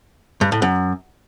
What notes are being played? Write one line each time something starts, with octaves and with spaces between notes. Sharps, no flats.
G2
A2
F#2